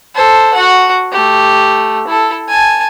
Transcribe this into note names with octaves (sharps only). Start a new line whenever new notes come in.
A4 C5
F#4 F#5
A3 G4
E4 A4
G#5 A5